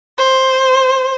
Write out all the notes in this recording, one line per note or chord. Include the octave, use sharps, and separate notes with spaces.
C5